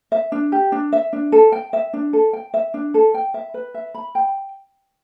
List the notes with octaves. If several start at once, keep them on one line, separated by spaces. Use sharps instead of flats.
E5
D4
G4
D4
E5
D4
A4
G5
E5
D4
A4
G5
E5
D4
A4
G5
E5
B4
E5
B5
G5